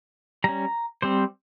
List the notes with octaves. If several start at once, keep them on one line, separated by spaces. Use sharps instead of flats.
G3 C#4 A#5
G3 C4 C5